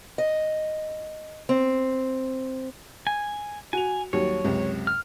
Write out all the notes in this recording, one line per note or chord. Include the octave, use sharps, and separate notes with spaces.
D#5
C4
G#5
F#4 G#5 F7
D#2 F#3 G3 C#5
C#2 F#2 C3
F6